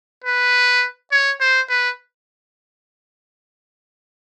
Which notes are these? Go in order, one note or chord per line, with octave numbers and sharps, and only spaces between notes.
B4
C#5
C5
B4